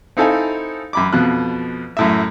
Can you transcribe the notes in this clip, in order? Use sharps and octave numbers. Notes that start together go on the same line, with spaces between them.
C4 D#4 E4 A4 F5 G#5
F#2 B5 D6
F2 B2 F#6
F#2 A2 E5